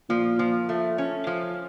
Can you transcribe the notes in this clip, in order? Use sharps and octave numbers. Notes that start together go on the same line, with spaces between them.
A#2 F3
F3
A3
C#4
F3